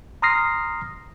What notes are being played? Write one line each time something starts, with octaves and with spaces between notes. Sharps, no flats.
A#5 C6 D#6 F6 A#6 C7